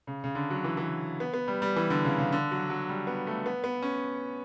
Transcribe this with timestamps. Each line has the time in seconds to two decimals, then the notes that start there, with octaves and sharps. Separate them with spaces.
0.07 C#3
0.24 C#3
0.35 D3
0.50 F#3
0.64 E3
0.77 E3
1.20 B3
1.34 B3
1.48 G3
1.62 G3
1.76 E3
1.90 D3
2.05 C#3
2.19 C#3
2.32 D3
2.51 F#3
2.70 F#3
2.89 G3
3.07 B3
3.27 A3
3.46 B3
3.64 B3
3.83 C#4